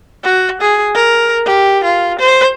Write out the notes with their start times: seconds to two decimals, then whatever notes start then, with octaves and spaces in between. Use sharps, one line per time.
0.24 F#4
0.61 G#4
0.95 A#4
1.45 G4
1.84 F4
2.19 C5